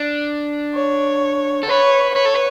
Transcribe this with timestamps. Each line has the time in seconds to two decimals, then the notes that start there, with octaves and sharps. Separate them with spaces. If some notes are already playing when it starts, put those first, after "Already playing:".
Already playing: D4
0.75 C#5
1.63 A4
1.68 B4 C#5
2.15 B4 C#5
2.25 A4
2.34 B4